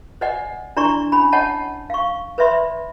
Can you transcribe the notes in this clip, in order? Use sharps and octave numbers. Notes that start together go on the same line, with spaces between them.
C5 D5 D#5 F#5 G#5
D4 E4 D5 A#5 C6 C#6
C#4 G#5 B5
C#5 D#5 F#5 A5
F5 C#6
B4 C5 D5 E5 B5 C6